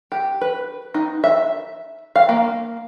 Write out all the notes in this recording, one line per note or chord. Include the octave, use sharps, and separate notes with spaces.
G4
B4
D#4
E5
F5
A#3